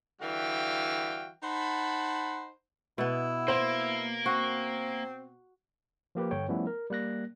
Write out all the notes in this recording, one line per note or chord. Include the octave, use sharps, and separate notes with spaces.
D3 E3 G3 F#4 F5 G5
D#4 C5 F#5 A5 B5
B2 B3 E4
A#3 C5
C4 F#4
F3 A#3 G4 B4
G2 D3 C#5 G5
F3 G3 A3 B3 C#4 E4
A#4
G3 A#3 F#6 A#6